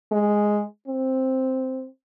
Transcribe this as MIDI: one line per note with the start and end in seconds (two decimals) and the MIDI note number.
0.12 0.63 56
0.88 1.87 60